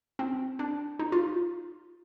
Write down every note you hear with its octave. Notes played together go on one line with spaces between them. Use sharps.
C4
D4
D#4
F4